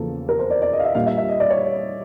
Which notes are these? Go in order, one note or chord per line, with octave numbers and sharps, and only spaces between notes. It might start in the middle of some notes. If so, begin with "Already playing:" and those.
Already playing: E2 C#3 F3 A#3 A4
A#4
C5
D5
D5
D#5
F5
E5
A#2 G3 A#3 D4 F5
E5
E5
D#5
D5
C#5